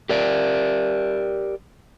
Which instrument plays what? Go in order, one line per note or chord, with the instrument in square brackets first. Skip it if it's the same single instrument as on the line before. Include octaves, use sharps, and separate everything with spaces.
[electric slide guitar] G4 A#4 D5